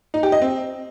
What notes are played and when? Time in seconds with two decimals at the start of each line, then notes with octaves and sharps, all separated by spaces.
0.14 D#4
0.23 G4
0.32 D#5
0.42 C4